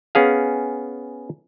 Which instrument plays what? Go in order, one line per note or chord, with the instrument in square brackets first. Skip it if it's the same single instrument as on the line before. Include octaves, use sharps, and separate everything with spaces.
[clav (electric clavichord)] B3 C#4 G#4 F5